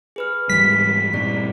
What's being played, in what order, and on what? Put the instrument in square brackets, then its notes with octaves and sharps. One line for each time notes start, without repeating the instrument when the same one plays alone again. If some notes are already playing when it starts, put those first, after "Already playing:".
[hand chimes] G#4 B4 F6
[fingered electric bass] G#2 E3 G3 [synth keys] B6
[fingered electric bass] G2 A#2 [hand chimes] C4 E4 D5